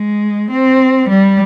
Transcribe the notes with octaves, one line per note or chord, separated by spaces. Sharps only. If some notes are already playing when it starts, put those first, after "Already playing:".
Already playing: G#3
C4
G3